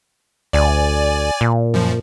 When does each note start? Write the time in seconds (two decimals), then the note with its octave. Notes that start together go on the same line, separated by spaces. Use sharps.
0.53 D2 D5 G#5
1.41 A#2
1.74 F#2 F3